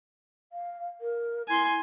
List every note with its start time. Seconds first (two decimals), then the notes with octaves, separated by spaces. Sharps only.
0.52 F5
1.01 A#4
1.48 E4 G#5 C6